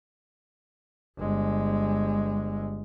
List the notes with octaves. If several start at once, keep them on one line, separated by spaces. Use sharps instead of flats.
G1 G#3